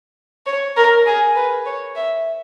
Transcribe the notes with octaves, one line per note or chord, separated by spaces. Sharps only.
C#5
A#4
G#4
B4
C#5
E5